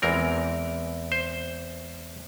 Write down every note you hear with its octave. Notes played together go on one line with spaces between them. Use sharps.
E2 E3 G#3 C4 A#4
C5